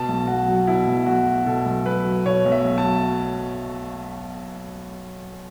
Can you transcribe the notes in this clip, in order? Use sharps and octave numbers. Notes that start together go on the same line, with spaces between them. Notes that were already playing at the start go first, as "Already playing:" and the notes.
Already playing: B2 A5
B1
B1 F#4
F#3
B2 E4
B1
B1 F#4
F#3
B2 A4
B1
B1 B4
F#3
B2 C#5
B1
E5
B1
A5
F#3